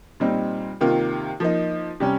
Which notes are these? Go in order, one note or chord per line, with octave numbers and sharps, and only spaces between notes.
A#2 G3 C4 D#4
C3 D#3 A#3 F4
F3 A#3 D#4
C3 G3 C#4